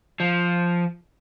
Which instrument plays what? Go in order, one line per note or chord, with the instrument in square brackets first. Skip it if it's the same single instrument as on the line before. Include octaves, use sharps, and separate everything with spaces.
[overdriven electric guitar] F3